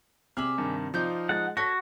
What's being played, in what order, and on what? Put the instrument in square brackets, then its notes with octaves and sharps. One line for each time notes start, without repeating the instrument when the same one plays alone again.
[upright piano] C3 F#7 [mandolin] G#4 D5 E5 [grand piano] F6
[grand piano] G2 D#3
[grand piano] F3 D#4 F4 [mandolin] D5 F5 G6
[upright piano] G#3 A6 [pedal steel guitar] F#5
[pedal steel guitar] F#4 [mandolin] A4 C#5 [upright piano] A#6 B6